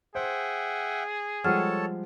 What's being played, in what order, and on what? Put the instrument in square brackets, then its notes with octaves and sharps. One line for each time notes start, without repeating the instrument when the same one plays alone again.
[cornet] G#4 [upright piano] C5 [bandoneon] E5 F#5 G5
[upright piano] F3 G3 G#3 [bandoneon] A4 C#5 A5 [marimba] F#5 F6